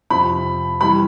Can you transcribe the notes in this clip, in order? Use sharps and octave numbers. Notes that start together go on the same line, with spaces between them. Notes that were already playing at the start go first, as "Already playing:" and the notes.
F2 C3 F3 B5
E3 G3 B5